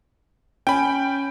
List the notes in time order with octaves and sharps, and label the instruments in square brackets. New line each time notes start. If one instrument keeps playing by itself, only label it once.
[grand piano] C#4 [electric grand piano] G5 B5